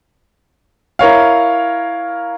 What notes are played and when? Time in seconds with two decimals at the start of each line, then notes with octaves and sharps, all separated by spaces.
0.99 E4 A#4 C#5 F5